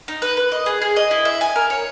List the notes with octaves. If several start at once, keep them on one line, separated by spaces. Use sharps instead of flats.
D#4
B4
B4
D#5
G#4
G#4
D#5
E4
E5
G#5
A#4
C#5